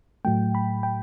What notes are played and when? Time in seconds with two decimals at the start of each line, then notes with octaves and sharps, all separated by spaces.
0.25 A2 F#3 A3 G5
0.55 B5
0.83 G5